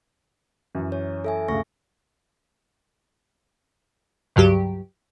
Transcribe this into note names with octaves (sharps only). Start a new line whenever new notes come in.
F#2 E3
C#5
A4 E5 G#5
D2 G2 C#3 C#6 A#6
C#2 G2 F#3 G4